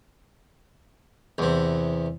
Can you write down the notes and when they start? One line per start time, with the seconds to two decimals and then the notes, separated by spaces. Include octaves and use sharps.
1.38 E2 C3